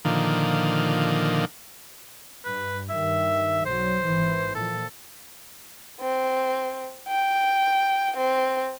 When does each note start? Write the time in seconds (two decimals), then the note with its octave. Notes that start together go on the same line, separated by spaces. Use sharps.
0.05 A#2 D3 D#3 F3
2.45 G2 B4
2.90 G2 D#3 E5
3.66 B1 F#3 C5
4.05 G#1 E3
4.55 A#2 F3 A4
6.01 C4
7.08 G5
8.17 C4